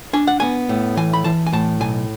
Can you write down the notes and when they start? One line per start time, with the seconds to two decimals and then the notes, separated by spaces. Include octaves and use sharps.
0.13 D4 G#5
0.27 F#5
0.40 B3 G#5
0.69 A2
0.97 E3 G#5
1.13 B5
1.24 E3 A5
1.47 G#5
1.53 A2 A5
1.80 B1 G#5